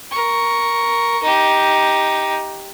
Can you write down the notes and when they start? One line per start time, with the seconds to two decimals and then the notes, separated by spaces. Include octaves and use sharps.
0.11 A#4 C#6
1.23 D#4 G4